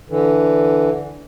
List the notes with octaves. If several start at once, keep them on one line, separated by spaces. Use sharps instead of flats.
D3 E3